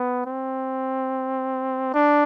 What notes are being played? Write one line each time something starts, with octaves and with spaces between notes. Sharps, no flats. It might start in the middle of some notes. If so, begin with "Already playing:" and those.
Already playing: B3
C4
D4